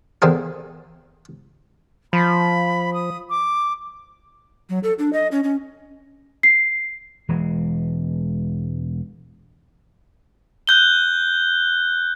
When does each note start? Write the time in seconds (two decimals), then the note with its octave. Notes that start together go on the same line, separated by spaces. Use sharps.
0.22 E2 D3 C4 G#4 A#4
2.13 F3 B5
2.94 D#6
3.30 D6
4.69 F#3
4.83 A4
4.99 D4
5.13 D#5
5.32 C#4
5.44 C#4
6.43 C7
7.28 E1 E3 G#3
10.67 F#6 G6 G7